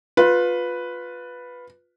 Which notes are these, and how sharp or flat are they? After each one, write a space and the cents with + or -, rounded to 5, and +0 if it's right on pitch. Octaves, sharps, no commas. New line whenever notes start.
F4 +20 B4 +0